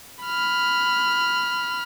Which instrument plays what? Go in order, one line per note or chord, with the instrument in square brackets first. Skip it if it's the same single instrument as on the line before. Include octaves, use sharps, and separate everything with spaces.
[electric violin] B5 F6